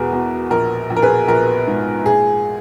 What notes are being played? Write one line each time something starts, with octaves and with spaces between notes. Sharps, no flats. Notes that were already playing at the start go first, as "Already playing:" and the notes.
Already playing: E1 E2 B2 G#4 A#4 B4
B2
A#1 A#4
A#1
A#4
G#4 B4
A#1 A#4
G#2
A#2 G#4